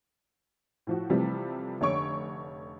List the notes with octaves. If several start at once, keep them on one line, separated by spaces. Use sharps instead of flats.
A2 F3 F#4
C3 E3 F3 G3 A3 C4
F1 D3 C#5 C#6 D7